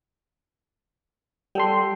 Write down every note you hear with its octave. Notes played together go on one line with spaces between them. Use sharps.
G3 A4 G5 C6